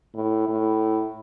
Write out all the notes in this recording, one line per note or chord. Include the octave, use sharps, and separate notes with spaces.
A2
A2